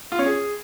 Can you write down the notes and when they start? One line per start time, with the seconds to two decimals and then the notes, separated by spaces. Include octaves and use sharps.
0.12 F4
0.19 C#4
0.26 G#4